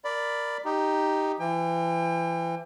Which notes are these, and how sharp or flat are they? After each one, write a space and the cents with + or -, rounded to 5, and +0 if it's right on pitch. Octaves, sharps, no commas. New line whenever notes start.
A#4 +0 D5 +0 B5 +10
D#4 +0 G4 +0
E3 +35 G5 +35